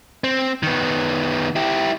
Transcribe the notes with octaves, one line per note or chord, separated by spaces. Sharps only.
C4
D#3 B3
E4 G4